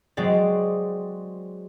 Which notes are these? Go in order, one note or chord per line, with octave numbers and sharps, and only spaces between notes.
F#3 G#3 C4 D5